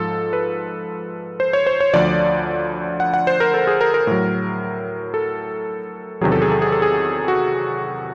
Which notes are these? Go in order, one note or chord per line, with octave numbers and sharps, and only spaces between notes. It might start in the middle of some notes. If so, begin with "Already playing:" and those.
Already playing: G#2 F3 A4
B4
C5
C#5
C5
C#5
D2 D3 F3 D5
F#5
F#5
C5
A#4
A4
G#4
A#4
A#4
A2 F#3
A4
E2 C3 D#3 F#3 G#4
A4
G#4
A4
G#4
A4
G#4
F#4